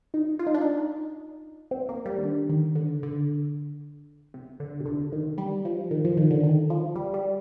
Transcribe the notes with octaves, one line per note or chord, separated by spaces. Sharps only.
D#4
F4
D#4
D4
D#4
C4
A#3
G3
D#3
D3
D#3
D3
D3
C3
D3
C3
D3
D#3
G3
F3
D#3
F3
D#3
D3
D#3
F3
G3
G3